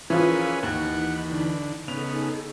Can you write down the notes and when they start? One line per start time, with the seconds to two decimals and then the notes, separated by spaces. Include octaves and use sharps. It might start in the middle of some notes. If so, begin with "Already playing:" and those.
0.10 E3 F3 C#4 F4 G#4 A#4 B4
0.63 D#2 E3 D#4 F#5 B5
1.32 D3
1.88 C#3 B3 D#4 G#4 A4 F7